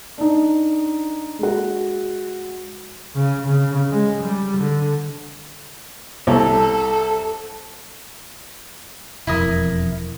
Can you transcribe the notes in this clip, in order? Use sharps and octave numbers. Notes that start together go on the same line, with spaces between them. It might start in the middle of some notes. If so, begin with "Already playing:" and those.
D4 D#4
G#3 F#4
C#3
C#3
G#3
G3
D3
C2 A4
E1 F2 E4 A#4 D#6